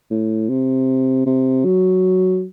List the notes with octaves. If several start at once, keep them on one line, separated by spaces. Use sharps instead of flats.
A2
C3
C3
F#3